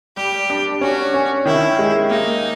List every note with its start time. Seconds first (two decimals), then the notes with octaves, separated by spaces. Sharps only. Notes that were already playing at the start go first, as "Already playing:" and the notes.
0.17 G3 G4
0.50 D4
0.81 C#4 F#4
1.14 C#4
1.45 D#3 E4
1.79 G#3
2.10 A#3 D#4